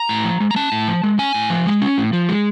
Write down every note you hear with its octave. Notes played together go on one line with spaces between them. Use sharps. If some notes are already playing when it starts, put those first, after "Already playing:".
Already playing: A#5
A2
F3
G#3
A#5
C#4 A5
A2
F3
G#3
C#4 G#5
A2
F3
G#3
C#4
A2
F3
G#3